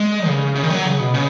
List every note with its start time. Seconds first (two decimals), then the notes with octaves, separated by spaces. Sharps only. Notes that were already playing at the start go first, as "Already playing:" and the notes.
Already playing: G#3
0.27 C#3
0.55 C#3
0.64 D#3
0.70 F#3
0.86 C#3
1.00 B2
1.14 C#3